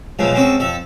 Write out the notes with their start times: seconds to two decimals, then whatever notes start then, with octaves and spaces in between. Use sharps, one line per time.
0.19 B2 F3 F#3 G#3 A3
0.34 G#3 C4 C#4 F#4 A4
0.59 F2 A4 E5